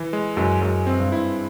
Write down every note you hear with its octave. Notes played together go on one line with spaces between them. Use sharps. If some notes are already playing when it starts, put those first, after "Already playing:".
Already playing: E3
G#3
F#2 G#3
F#2 G#3
C4
G2
E4